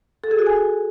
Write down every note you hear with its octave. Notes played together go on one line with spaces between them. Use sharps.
A4
G#4
F#4
G#5